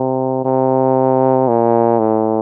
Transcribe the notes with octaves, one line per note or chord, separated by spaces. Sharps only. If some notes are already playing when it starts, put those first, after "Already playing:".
Already playing: C3
C3
A#2
A2